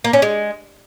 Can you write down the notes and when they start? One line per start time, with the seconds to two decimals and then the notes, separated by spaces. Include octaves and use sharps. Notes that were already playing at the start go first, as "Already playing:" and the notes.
0.04 A#3
0.13 C#4
0.22 G#3